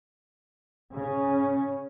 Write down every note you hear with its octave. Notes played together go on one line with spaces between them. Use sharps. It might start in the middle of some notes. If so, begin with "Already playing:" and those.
C#3 C#4